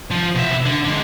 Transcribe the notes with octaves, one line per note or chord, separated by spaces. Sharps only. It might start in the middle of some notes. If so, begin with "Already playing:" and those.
F3
B2 E5
D3
D3 G#3